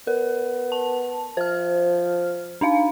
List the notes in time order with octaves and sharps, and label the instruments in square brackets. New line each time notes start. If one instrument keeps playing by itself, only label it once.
[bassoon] B3 [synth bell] A#4
[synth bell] A5
[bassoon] F3 [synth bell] C5 F6
[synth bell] D4 D#4 F5